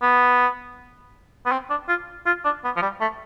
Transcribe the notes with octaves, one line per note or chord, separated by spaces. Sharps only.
B3
B3
C4
D4
F4
F4
D4
B3
F3
G3
A3